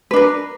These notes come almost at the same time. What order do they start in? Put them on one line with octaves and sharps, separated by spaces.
B4 D4 A#4